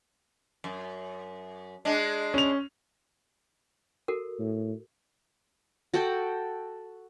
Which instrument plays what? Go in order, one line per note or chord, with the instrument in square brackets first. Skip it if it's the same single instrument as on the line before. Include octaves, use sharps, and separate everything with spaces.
[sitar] F#2
G#3 D4
[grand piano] C#4 F7
[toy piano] F#4 A4 A#4
[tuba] A2
[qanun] F#4 A4 F#5 G5